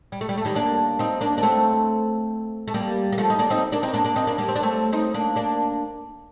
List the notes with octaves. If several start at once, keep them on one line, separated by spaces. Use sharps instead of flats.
G3
A3
G3
A3
D#3 G3
A#3 D4
C4 D#4
A#3 D4
D4
A3 C4
A3
G3 A#3
A#3
F3 A3
D#4
A#3 D4
C4 D#4
A#3 D4
C4 D#4
A#3 D4
A#3 D4
C4 D#4
A#3 D4
G3 A#3
C4
D4
A3 C4
C4 D#4
A#3 D4
A#3 D4